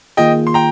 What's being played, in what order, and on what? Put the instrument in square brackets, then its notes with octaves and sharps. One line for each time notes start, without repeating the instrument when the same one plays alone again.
[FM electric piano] D#3 A#3 F4 G#4 [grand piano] D#5 G5
[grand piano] C6
G5 A#5